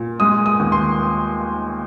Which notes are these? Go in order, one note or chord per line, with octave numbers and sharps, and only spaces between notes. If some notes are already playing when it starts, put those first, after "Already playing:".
Already playing: A#2
G#3 D#6
D#6
D#2
C6